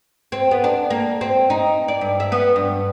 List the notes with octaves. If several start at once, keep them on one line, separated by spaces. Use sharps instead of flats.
C4
B3
D4
A#3
C4
D#4
D5
G2
E5
B3
G2